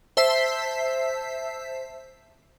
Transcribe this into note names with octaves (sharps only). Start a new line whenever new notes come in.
C5 E5 A5 E6 B6 C7